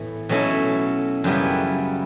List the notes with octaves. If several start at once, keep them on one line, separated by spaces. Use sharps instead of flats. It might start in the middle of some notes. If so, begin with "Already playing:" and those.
Already playing: A2 E3 B3
B2 F#3 A3 C#4 E4
F#2 C#3 G3 B3 E4